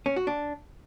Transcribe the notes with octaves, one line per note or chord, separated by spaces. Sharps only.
C#4
F#4
D4